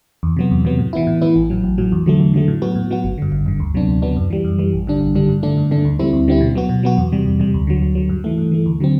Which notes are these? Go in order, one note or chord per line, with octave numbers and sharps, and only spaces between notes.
E2
C3 F#3 B3
E2
C3 F#3 B3
A2
E3 B3 E4
A2
E3 B3 E4
A1
A2 F#3
A1
A2 F#3
E2
D3 F#3 A3
E2
D3 F#3 A3
A2
F#3 B3 F#4
A2
F#3 B3 F#4
G1
G2 D3
G1
G2 D3
D2
C3 F#3 B3 D4
D2
C3 F#3 B3 D4
F#2
E3 G3
F#2
E3 G3
A1
G2 D3 G3 D4
A1
G2 D3 G3 D4
G2
D3 A3 D4
G2
D3 A3 D4
D2
D3 G3 C4 E4
D2
D3 G3 C4 E4
B2
F#3 B3 F#4
B2
F#3 B3 F#4
E2
C3 G3
E2
C3 G3
D2
D3 F#3
D2
D3 F#3
G2
E3 A3
G2
E3 A3
D2
D3 F#3 C4